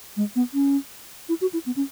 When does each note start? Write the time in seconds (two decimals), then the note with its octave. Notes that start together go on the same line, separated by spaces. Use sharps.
0.17 G#3
0.36 B3
0.54 C#4
1.29 E4
1.41 F#4
1.53 E4
1.66 B3
1.76 C#4